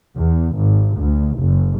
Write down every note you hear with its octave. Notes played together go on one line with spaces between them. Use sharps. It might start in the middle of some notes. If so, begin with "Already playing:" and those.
E2
G#1
D2
F#1